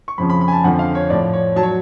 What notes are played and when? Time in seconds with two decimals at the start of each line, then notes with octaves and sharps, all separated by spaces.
0.08 C#6
0.18 F2 C#3 F3 B5
0.30 B5
0.41 B5
0.48 G#5
0.53 A5
0.64 F2 D3 F3 F#5
0.79 F5
0.95 C#5
1.10 A2 F3 D5
1.33 C#5
1.56 F#3 A5
1.63 C#5